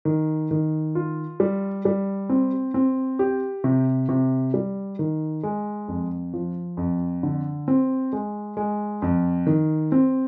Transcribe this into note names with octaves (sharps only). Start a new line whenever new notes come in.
D#3
D#3
F4
G3
G3
C4
C4
G4
C3
C3
G3
D#3
G#3
F2
F3
F2
D3
C4
G#3
G#3
F2
D#3
C4